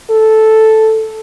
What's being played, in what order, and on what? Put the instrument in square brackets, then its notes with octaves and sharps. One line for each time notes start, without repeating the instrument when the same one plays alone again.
[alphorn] A4